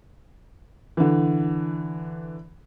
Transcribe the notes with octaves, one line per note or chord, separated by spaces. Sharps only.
D3 E3